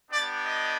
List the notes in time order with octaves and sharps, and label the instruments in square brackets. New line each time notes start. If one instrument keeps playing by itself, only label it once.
[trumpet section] B3 D4 G4 D5
D#5